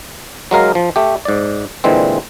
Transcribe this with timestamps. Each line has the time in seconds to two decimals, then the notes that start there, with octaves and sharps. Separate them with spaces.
0.51 F#3 G#3 A#4 F5
0.75 F3
0.96 A3 G4
1.25 G#2 D5
1.84 A#2 D3 E3 G#3 C4